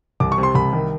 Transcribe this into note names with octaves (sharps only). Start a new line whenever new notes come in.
C2 D6
C#6
C3
C6
C2 B5
D#3